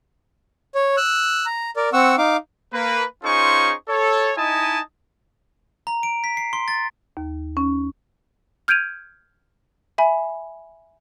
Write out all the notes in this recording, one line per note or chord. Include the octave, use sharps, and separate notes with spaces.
C#5
E6 F#6
A#5
A#4 D5
C4 F#5 C#6 E6
D#4 F5 D6
A#3 B4
C#4 D#4 F4 G#4 C5 C#6
A4 C#5
D#4 E4 D#5 G#5 A5 D#6
A#5
D7
B6
C7
C6
A6
D#2
C#4
F6 G6 G#6 D7 D#7 F7
E5 G#5 B5